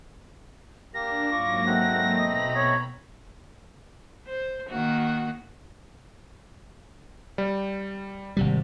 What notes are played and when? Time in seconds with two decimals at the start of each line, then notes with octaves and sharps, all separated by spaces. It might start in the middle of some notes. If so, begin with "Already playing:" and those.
0.94 A#3 D4 G4 A#4 A#6
1.31 G#2 F#3 A#3 F4 C#6 D6
1.67 A3 C4 D#4 F#5
2.18 B2 D#5 A#5 B5
2.56 C#5
4.27 C5
4.69 D#3 A#3 F#4
7.38 G3
8.37 G#1 C3 G3